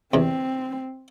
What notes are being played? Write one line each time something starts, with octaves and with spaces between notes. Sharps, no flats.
E2 C3 C4